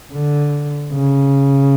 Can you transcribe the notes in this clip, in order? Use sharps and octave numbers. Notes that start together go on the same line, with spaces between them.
D3
C#3